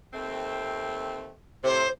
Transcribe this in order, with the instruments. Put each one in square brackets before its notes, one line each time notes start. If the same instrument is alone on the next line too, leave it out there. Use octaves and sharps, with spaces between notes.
[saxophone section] D#2 A3 C4
[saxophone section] A2 C3 [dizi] C5